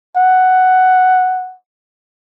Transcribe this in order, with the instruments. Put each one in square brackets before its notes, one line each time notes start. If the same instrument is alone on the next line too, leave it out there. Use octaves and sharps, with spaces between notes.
[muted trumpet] F#5